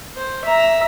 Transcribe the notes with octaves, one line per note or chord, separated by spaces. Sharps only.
C5
E5 A#5